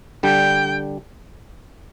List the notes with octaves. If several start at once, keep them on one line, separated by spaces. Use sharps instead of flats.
D3 G3 G5